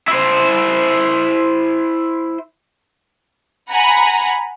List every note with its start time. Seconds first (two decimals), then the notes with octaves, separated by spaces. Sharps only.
0.08 E4 C5
3.71 F#5 G#5 A#5 B5